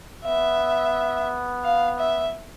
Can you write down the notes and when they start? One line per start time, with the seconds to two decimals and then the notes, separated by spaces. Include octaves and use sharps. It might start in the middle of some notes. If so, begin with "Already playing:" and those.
0.25 B3 E5
1.64 F5
1.98 E5